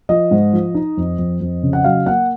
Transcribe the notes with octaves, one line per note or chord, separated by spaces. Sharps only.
F3 D#5
G#2
F3
D#4
F2
F2
F2
C#3
F#5
F#3 F5
A#3 F#5